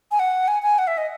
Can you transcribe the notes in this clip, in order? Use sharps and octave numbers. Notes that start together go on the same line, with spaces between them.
G#5
F#5
G#5
G#5
F#5
E5
D#5